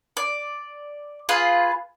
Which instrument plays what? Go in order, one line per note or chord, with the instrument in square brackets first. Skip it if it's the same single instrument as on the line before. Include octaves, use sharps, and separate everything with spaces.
[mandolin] D5
F4 G#4 B4